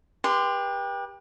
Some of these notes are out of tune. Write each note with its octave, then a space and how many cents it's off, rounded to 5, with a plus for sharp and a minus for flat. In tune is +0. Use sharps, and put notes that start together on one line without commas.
G4 +20 B4 -30 C6 -20